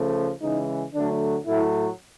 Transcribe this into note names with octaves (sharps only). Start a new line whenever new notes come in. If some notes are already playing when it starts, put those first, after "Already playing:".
Already playing: C#3 F3 A3
C#3 E3 G#3 D#4
D3 F#3 A3 D4
A2 F#3 A3 E4